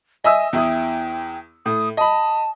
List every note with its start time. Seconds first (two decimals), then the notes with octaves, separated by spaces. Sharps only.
0.24 D#5 E5 G#5 E6
0.53 E2 E4 G5 D#6
1.66 A2 D#6
1.97 D#5 A5 B5